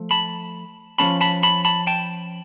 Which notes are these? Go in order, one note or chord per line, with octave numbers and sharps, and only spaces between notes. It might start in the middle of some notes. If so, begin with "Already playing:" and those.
Already playing: F3 A3
A5 B5
F3 A#3 C#4 A5 B5
A5 B5
A5 B5
A5 B5
G5 A5